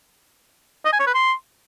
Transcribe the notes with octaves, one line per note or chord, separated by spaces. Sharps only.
D#5
G#5
C#5
B4
C6